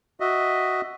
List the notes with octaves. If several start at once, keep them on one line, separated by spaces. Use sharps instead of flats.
F#4 D#5 E5